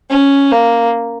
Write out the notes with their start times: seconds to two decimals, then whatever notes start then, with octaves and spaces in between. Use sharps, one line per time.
0.10 C#4
0.52 A#3